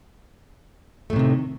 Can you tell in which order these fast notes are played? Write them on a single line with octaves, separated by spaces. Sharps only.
A3 A2 C3 D#3